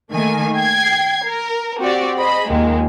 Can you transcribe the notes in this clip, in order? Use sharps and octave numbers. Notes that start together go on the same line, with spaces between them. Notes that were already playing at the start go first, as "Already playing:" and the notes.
D#3 A3 A#3 G#5
G5 G#6 C7
A#4
C4 F#4 G4 D5
G#4 C5 D#5 B5
D#2 A#2 D#3 G#3 A#3